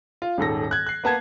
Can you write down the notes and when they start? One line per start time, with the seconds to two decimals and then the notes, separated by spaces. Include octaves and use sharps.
0.22 F4
0.38 D#1 G#2 A4 A#6
0.71 F#6 G#6
0.86 F#6 C7
1.04 A#3 B3 A5 G#6